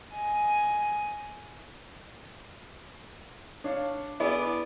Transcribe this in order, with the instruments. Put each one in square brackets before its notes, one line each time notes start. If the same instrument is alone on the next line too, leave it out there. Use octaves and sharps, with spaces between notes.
[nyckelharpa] D#5 G#5
[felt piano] D4 [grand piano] C#5 F5
[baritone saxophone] B3 [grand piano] E4 G#4 [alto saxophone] D5